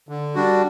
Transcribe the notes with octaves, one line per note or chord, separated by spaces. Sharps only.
D3
G3 D4 F#4